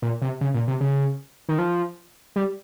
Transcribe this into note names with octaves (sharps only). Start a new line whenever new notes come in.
A#2
C3
C#3
A#2
C3
C#3
D#3
F3
G3